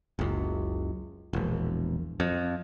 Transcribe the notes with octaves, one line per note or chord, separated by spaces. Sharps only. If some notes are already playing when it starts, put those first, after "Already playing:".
F#1 C#2
E1 A#1
F2